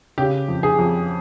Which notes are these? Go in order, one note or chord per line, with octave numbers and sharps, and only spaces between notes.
C#3 G4
F2
G#4
F2